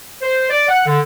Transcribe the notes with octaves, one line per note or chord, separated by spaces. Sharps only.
C5
D5
F#5
D3